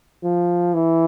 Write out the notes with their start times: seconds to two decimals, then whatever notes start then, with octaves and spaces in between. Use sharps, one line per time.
0.24 F3
0.74 E3